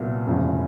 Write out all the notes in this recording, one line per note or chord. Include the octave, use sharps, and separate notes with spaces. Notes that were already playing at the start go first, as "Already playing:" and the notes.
Already playing: C2 A#2 F#3 B3
F1 E2 C#3 F3